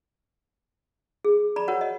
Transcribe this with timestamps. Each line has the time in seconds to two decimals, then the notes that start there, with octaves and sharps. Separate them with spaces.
1.25 G#4
1.56 D5 A#5 B5
1.68 F#4 A#4 C#5 F#5
1.81 D#5